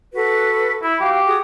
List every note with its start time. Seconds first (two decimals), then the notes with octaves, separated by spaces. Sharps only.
0.14 F#4 A4 B4
0.83 E4 B5
1.01 F#4 G4 F5
1.27 F#4 G#4 D#6